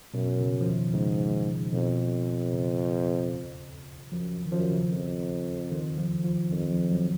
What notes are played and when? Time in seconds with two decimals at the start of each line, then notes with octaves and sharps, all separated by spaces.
0.14 F#2 B2
0.41 C#3
0.61 F3
0.67 D#3
0.93 G#2 C#3
1.73 F2 B2
2.53 C#3
4.12 F#2 F3
4.46 D#3
4.52 F#2 F3
4.72 C#3
4.92 F2
5.72 D#3
5.98 F3
6.24 F3
6.51 F2 D#3
6.71 F3
6.91 F#3